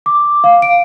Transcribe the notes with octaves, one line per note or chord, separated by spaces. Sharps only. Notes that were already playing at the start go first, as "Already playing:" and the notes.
D6
F5
D7